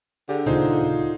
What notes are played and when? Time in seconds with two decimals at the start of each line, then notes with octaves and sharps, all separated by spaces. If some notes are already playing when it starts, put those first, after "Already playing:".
0.29 D3 G4 G#4
0.46 D#2 A#2 C#3 D#4 F4 G#4 C5